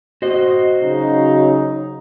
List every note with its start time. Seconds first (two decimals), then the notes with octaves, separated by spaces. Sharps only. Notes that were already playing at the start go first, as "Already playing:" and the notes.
0.22 F#4 C5 D#5
0.81 C#3 F#3 D#4